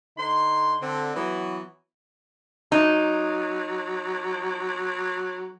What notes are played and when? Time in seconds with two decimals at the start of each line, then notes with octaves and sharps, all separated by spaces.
0.18 D3 D#4 C6
0.82 D3 C4
1.16 E3 F#3 B3 F#4
2.72 F#3 D#4